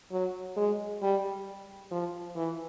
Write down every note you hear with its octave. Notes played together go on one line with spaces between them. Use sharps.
F#3
G#3
G3
F3
E3